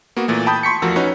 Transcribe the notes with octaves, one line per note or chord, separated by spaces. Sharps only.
A#3 B3 F#4
A#2 E3 A3
G5 A5 B5 D#6 G6
C6 C#6 B6 C#7
E2 F3 A3 F#4 A#4 E6
C#4 D#4 F#4 B4 C#5